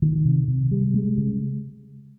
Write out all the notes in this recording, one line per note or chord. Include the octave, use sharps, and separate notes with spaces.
D#3
C3
C3
G3
G#3
C#3